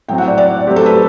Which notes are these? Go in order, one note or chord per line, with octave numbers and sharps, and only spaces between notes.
A2 F#3 C4 G5
F#5
D5
D5
F#3 A3 C4 G4 C5
A4
B4